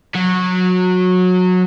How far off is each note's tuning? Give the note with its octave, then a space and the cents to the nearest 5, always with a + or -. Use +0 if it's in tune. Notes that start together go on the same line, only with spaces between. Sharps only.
F#3 -20